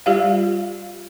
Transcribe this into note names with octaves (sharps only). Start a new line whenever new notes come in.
G3 F4 G4 D5 F5